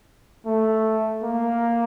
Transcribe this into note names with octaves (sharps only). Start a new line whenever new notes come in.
A3
A#3